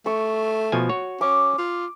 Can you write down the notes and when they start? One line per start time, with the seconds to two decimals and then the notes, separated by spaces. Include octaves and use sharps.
0.06 A3 C#6
0.72 B2 F3 G#5
0.89 F#4 C#5
1.21 C#4 D6
1.58 F4